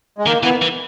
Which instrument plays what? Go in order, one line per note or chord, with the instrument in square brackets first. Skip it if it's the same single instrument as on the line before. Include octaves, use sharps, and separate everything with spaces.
[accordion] G#3
[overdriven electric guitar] D#3 [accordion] A#3
[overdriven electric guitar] E3 [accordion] B3
[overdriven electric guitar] E3